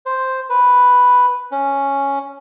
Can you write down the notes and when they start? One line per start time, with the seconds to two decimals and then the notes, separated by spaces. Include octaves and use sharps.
0.06 C5
0.50 B4
1.52 C#4